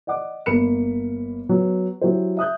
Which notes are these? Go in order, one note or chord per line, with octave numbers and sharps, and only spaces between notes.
D5 D#5 F#5 D6
G1 A#3 B5 C#7 E7
F#3 B3
F#3 E4 G4 C5
E5 D#6 F#6 G6